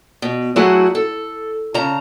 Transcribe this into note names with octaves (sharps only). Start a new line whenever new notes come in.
B2
F#3 A3 E4 F#4 G#4 F#5
A4
C#3 A5 A#5